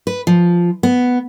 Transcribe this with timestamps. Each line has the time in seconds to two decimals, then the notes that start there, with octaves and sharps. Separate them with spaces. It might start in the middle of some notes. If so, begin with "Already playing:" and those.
0.07 B4
0.27 F3
0.83 B3